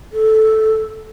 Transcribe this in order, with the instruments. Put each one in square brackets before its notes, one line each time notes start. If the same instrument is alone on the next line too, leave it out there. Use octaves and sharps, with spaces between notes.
[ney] A4